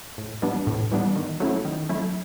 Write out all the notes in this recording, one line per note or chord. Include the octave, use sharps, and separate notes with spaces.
A2
E3 G3 B3 D4
A2
E3 G3 B3 D4
D#3
F#3 A3 C#4 E4
D#3
F#3 A3 C#4 E4